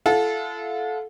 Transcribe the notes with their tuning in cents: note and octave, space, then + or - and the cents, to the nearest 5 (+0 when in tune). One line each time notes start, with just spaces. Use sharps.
F4 -45 A4 -20 F#5 -45